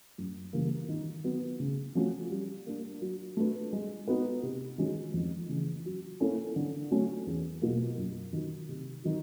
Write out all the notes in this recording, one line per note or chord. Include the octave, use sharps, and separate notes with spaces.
F#2
C#3 E3 G3 A#3
D#3
F#3 B3
C#3
F3 A3 C#4 F#4
G3
A#3 D4
F#3
A3 D4 F#4 B4
G#3
B3 D#4 F#4 B4
C3
D#3 G#3 C#4 F#4
F2
C#3 E3
F#3
A#3 C#4 E4 A4
D3
F#3 A3 C#4
E2
B2 F#3 A#3
F#2
D#3 F#3
C3
D#3 F#3